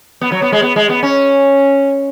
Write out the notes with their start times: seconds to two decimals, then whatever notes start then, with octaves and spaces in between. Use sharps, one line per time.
0.21 B3
0.32 F#3
0.42 B3
0.52 G#3
0.62 B3
0.76 G#3
0.89 B3
1.03 C#4